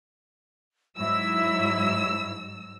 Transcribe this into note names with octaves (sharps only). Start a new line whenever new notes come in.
G#2 F#3 E4 E6